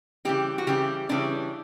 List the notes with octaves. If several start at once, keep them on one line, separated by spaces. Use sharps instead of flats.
C#3 E3 G3 G4
F#4
C#3 E3 G3 G4
C#3 E3 G3 D4